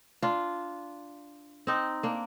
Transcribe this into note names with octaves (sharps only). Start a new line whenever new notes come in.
D4 F4
C4 D#4
A#3 D4